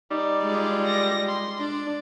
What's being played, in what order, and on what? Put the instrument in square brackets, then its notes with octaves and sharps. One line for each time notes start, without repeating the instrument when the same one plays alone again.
[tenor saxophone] G3 [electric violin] D#4 D5
[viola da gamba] G#3 F4
[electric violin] A#6
C6
[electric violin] D4 [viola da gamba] D5